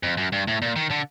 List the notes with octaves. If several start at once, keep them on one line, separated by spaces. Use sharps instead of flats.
F2
F#2
G2
A2
A#2
D#3
D3